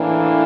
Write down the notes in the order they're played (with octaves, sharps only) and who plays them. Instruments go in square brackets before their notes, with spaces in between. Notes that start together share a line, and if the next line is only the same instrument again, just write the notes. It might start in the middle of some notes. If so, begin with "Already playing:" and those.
Already playing: [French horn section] A2 E3 A#3 D4